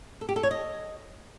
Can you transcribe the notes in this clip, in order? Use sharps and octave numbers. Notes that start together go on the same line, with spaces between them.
A4
G4
A4
C#5
D#5